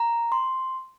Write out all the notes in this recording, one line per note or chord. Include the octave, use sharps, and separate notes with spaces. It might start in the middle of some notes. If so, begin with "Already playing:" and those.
Already playing: A#5
C6